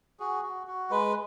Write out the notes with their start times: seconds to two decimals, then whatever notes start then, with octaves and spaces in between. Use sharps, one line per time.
0.20 F#4 G#4
0.43 F#4
0.67 F#4
0.90 G#3 B4